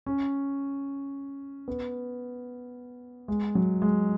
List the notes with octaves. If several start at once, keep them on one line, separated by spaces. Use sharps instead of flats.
C#4
B3
G#3
F#3
G#3